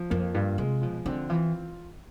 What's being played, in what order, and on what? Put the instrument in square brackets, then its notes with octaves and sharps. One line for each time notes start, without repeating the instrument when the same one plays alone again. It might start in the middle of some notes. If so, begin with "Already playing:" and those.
Already playing: [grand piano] F3
[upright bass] F2 [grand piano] A#3
[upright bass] G2 [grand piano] F4
[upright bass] C3 [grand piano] G#3
[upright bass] B2 [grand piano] F3
[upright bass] D3 [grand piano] C4
[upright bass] E3 [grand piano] F4